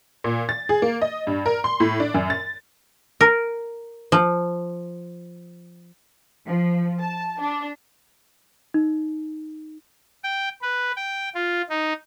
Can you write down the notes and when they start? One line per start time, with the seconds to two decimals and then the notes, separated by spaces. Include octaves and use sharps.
0.24 A#2
0.49 A6
0.69 G#4
0.82 A#3
1.02 D#5
1.27 G2
1.46 A#4
1.64 C6
1.80 A2
2.00 D4
2.14 F#2
2.30 A6
3.21 A#4
4.12 F3
6.47 F3
7.00 A5
7.40 D4
8.74 D#4
10.24 G5
10.62 B4
10.96 G5
11.35 F4
11.69 D#4